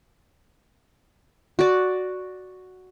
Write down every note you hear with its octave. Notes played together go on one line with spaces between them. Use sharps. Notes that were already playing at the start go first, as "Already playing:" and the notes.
F#4 D5